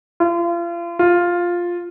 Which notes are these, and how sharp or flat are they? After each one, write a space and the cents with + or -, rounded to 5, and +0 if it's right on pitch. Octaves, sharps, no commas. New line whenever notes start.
F4 -35
F4 +5